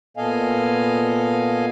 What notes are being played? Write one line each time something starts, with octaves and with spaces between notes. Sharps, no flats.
A#2 B3 A4 D#5 F5 G#5